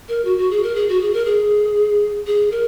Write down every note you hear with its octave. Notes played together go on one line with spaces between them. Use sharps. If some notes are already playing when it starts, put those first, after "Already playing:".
A#4
F#4
F#4
G#4
A#4
G#4
F#4
G#4
A#4
G#4
G#4
A#4